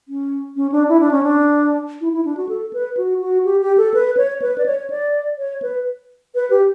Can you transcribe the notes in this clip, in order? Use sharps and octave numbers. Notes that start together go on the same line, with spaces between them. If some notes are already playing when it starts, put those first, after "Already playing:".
C#4
C#4
D4
E4
D4
C#4
D4
E4
E4
D4
F#4
A4
B4
F#4
F#4
G4
G4
A4
B4
C#5
B4
D5
C#5
D5
C#5
B4
B4
G4